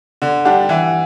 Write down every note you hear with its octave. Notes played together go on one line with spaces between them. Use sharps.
D3
G3 D4 G4 F#5
E3 E5